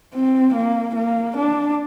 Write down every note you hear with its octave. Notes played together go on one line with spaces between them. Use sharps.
C4
A#3
A#3
D4